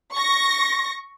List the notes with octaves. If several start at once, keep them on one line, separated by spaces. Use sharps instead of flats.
C#6 A#6